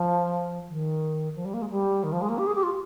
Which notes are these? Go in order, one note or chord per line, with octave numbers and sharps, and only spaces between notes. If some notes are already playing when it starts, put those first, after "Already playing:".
Already playing: F3
D#3
F3
G3
A#3
G#3
G3
D#3
F3
G#3
A#3
G4
G#4
G4
F4